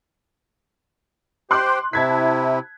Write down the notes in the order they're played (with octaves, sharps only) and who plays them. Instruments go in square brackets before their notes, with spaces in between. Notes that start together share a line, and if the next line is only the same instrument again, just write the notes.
[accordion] G4 C5 G5 [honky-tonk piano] C6 D6 F#6
[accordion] C3 E4 [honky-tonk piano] A5 G#6 B6